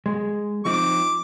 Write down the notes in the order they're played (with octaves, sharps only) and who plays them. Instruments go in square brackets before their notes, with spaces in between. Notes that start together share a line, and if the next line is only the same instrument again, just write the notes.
[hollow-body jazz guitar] G#3
[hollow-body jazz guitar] F3 C4 D#4 [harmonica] D6